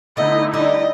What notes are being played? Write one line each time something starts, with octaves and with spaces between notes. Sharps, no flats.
D3 A3 B3 D#4 E4 D#5
G3 D#5